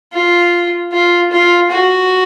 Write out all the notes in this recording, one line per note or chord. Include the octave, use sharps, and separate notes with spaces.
F4
F4
F4
F#4